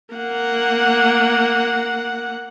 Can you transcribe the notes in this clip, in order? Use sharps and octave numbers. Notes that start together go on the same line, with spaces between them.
A#3 F#5